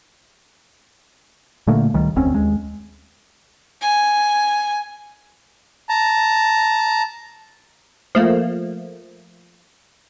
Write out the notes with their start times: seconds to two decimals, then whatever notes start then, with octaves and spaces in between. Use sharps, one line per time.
1.67 A#2 D3 A3 A#3
1.94 C#2 D#3 G3
2.16 F1 D2 C4 C#4
2.32 D#2 G#3
3.81 G#5
5.89 A5 A#5
8.15 F3 A3 A#3